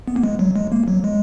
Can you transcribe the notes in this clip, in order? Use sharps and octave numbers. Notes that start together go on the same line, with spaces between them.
B3
A#3
G#3
F#3
G#3
A#3
F#3
G#3